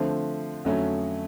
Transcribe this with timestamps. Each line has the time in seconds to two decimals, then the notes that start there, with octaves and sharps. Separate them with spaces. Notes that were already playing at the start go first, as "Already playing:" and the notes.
Already playing: D3 F3 A3 C4
0.65 F2 D3 F#3 A3 C#4